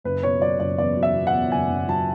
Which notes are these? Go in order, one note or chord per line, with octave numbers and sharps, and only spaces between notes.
F#1 B4
B2 C#5
F#3 D5
F#1 D5
E2 D5
F#3
E5
B2
F#5
E2
F#1 G#5
F#1
F#3 A5